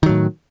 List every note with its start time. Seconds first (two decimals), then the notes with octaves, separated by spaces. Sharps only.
0.03 D#3
0.06 F#3
0.09 A2